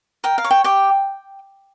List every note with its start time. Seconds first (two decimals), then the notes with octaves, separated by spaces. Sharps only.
0.24 A#4 G5
0.38 F5
0.44 C#5
0.51 G5
0.64 G4 G5